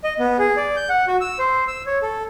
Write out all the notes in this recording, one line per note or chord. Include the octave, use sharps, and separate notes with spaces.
D#5
B3
G#4
D5
G6
F#5
F#4
E6
C5
E6
C#5
A4